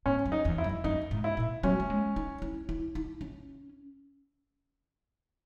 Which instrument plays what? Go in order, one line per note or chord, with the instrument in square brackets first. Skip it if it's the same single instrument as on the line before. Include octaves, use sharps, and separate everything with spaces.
[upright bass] G#2 [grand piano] C#4
[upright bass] F#2
[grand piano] D#4
[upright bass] E2
[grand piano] E4
[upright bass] F#2
[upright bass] F#2 [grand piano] D#4
[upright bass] G#2
[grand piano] E4
[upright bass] A#2
[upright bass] F#3 [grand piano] C#4
[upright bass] A#3
G#3
D#4
E4
E4
D#4
C#4